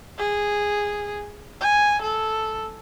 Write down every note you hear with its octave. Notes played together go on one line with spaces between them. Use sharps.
G#4
G#5
A4